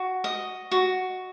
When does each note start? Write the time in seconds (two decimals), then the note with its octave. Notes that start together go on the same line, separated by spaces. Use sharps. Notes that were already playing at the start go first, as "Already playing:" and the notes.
Already playing: F#4
0.24 D#5
0.71 F#4